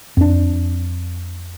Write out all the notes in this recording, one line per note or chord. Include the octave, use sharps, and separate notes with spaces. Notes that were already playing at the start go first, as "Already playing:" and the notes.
F2 D4